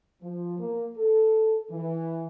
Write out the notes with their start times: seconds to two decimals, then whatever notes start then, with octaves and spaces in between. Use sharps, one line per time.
0.22 F3
0.59 A#3
0.97 A4
1.71 E3